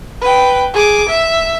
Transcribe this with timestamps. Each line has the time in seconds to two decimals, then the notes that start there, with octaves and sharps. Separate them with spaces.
0.21 B4 G5
0.74 G#4 D6
1.09 E5